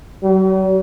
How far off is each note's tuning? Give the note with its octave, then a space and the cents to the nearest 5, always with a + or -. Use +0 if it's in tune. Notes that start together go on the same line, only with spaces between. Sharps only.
F#3 +45